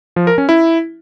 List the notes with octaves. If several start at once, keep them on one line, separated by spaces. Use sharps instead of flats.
F3
A#4
C#4
E4